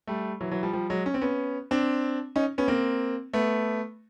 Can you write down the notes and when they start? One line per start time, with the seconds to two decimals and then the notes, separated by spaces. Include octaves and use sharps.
0.07 G3 A3
0.40 E3 F#3
0.51 E3 F#3
0.63 F3 G3
0.73 F3 G3
0.90 F#3 G#3
1.06 C#4
1.14 C4
1.21 B3 C#4
1.71 C4 D4
2.36 C#4 D#4
2.58 B3 C#4
2.68 A#3 C4
3.33 A3 B3